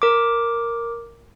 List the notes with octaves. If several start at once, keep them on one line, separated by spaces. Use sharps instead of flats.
A#4 D6